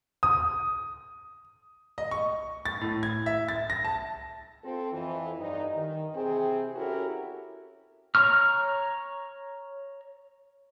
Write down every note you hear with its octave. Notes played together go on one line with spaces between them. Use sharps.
D#6
D#5
C#6
A6
A2
G#6
E5
A6
A#6
A5
C4 F4 A4
F2 E3
G2 D#4
D#3
C3 E3 C4 G#4
C#4 E4 F#4 G4 A4 A#4
C#5 A#5 C#6 F6